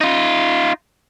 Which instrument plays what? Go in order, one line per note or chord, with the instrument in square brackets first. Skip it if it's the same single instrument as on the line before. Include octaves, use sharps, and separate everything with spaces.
[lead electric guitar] D#4 F4